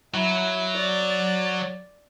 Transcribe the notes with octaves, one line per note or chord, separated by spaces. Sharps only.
F#3 E4
D5